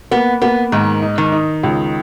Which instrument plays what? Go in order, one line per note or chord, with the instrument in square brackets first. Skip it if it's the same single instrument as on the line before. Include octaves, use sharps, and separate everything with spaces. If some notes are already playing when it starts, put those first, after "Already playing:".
[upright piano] A#3 [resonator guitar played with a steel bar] B3
[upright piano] A#3 [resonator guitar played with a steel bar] B3
[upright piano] G#2 [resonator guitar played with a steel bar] D#3
[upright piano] D#4
[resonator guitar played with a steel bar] D#3
[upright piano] D#4
C#2